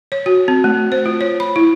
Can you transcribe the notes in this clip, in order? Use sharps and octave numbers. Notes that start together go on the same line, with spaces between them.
C#5
F#4
C4
A3
C5
F4
C#5
B5
E4